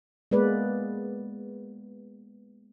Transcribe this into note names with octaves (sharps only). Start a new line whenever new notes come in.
G#3 A#3 B3 B4 D5